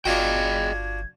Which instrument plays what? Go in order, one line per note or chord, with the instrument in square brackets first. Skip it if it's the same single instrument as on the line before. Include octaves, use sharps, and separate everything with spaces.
[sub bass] G1 [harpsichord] D4 F4 F#4 [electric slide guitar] G#4 D#5 G5 [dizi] G#6